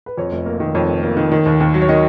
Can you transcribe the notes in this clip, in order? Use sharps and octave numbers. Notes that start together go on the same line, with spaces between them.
B4
F2 C#5
F1
A#3
D#3
F2 C#5
F1
A#3
D#3
D#3
D#2
D#2
F#3
C#5
D#3 D#5